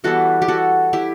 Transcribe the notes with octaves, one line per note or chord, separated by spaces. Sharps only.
E3 G3 B3 E4 F#4 A4
G4
F#4 A4
E4 G4